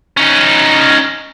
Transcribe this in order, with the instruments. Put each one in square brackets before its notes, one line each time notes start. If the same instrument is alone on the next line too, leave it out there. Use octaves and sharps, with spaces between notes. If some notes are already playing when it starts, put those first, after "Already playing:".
[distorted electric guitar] C#4 D#4